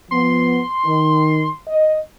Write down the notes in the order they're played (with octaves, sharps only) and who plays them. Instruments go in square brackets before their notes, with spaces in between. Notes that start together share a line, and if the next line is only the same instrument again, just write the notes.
[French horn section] F3 B3 [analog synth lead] C6
[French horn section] D#3
D#5